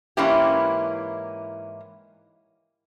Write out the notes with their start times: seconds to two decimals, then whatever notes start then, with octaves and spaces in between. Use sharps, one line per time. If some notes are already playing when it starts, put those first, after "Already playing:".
0.17 G#2 E3 A#3 C#4 E4 G4